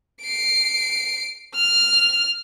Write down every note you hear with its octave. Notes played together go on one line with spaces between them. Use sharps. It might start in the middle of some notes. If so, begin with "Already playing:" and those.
C7 D7
F6